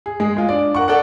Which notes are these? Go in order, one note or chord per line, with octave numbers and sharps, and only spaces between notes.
G#4
G#3 G#4
G#3 F4
D4 D5
A#4 F#5 C#6
A4 D5 F#5